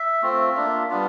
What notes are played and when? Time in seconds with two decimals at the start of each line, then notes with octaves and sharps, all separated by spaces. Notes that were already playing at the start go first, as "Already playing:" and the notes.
Already playing: E5
0.22 A3 C4 F4
0.56 A#3 D4 F4
0.90 G3 B3 D4 F4